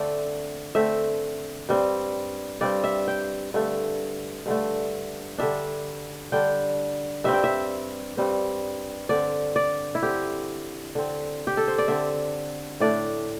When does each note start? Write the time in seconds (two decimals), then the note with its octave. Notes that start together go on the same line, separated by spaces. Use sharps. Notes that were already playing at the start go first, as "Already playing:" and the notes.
Already playing: D3 A3 C4 D5
0.75 D3 A3 C4 E5
1.69 G2 G3 C4
2.61 G2 G3 C4 D5
2.84 E5
3.08 G5
3.54 G2 D3 A3
4.46 G2 D3 A3
5.38 D3 G3 D4 E5
6.32 D3 G3 D4 G5
7.24 G2 G3 C4 E5
7.33 G5
7.44 E5
8.17 G2 G3 C4
9.09 D3 C4 D5
9.56 D5
9.95 E4
10.03 D3 C4 G4
10.95 D3 C4
11.47 G4
11.57 A4
11.68 C5
11.78 D5
11.88 D3 C4 E5
12.80 A2 A3 D4 D5